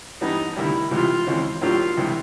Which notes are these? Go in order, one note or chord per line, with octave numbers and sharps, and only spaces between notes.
G2 E3 G3 B3 D#4
D2 C3 D#3 G3 E4
C#2 C3 E3 G3 F4
D#2 C#3 E3 G#3 C4
A2 F#3 A#3 D4 F4 G4
C#2 C3 E3 G3